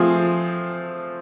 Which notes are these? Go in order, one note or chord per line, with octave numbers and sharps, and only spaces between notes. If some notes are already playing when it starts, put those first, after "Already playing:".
Already playing: F3 A3 C4 F4 G#4